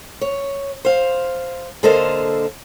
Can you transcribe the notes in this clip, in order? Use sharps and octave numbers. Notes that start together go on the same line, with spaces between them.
C#5
C5 F5
D3 A#3 A4 C5 D#5 F5